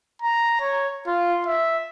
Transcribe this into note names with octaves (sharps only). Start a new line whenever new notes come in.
A#5
C#5
F4
E5